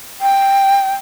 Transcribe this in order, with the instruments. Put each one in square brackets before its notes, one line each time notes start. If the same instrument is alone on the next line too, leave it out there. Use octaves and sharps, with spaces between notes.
[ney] G5